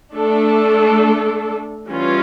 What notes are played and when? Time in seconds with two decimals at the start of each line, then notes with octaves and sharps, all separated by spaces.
0.15 A3 D4 A4
1.89 E3 G3 C#4 F4